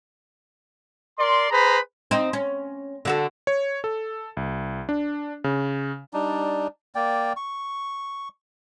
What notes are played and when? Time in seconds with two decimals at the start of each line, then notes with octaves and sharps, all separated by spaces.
1.19 A#4 D5 C6
1.51 G#4 B4 C5 A#5 B5
2.11 C4 D#4
2.33 C#4
3.05 D3 F#4 A4
3.47 C#5
3.84 A4
4.37 C2
4.89 D4
5.44 C#3
6.14 G3 D4 D#4
6.95 A#3 D5 G5
7.37 C#6